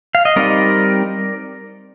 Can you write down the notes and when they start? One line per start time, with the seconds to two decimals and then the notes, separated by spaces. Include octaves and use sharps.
0.15 F5
0.25 D#5
0.36 G3 C4 D#4 A#4 D5